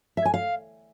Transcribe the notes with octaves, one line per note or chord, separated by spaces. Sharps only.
E5
G#5
F5